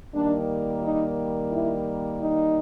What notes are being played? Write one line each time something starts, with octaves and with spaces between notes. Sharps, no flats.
D#3 G3 A#3 D4
D#4
E4
D#4